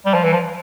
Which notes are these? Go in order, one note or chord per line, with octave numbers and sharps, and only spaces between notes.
G3
F3
E3
F3